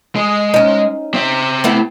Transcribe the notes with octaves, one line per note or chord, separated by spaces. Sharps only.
G#3
C#4 D#4
C4 E5
A3 B3 E4